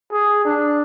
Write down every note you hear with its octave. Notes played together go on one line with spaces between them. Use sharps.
G#4
D4